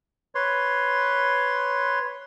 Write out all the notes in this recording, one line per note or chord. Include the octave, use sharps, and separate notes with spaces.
B4 C#5 C6